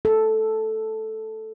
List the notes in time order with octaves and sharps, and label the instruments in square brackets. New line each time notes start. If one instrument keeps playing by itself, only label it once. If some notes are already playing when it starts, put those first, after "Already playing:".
[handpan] A4